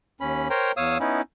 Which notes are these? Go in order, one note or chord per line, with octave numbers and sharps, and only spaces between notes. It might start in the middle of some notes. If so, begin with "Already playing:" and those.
D#2 C#4 B5
A#4 C5 C#5 G5 A#5
E2 C#5 F5 D#6 E6
B3 C#4 D#4 E4